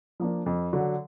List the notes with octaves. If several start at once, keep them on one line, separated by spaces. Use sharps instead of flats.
F3 A#3 D4
F2
D3 F#3